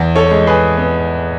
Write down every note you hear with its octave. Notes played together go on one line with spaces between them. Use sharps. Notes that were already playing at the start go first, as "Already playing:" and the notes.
Already playing: E2
A4 C#5
G#3
G#4 B4
B3